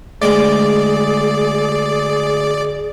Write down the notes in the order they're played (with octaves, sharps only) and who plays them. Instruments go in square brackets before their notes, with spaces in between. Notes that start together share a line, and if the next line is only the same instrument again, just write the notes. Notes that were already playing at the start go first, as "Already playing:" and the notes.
[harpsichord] D2 G#3 D6 [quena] G#4 [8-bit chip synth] D5